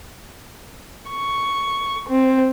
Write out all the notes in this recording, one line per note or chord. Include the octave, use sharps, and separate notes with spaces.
C#6
C4